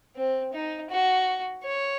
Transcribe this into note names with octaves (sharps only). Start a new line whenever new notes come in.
C4
D#4
F#4
C#5